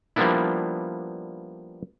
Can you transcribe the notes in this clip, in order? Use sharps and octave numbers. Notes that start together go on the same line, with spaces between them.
F3 G3 A#3 B3 D4 E4